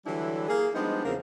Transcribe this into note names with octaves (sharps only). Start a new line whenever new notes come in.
D3 E3 F#3 G3 D4 E4
A#3 G#4
F3 G3 G#3 B3 D4 D#4
E2 C#3 F3 A#3 C4 A#4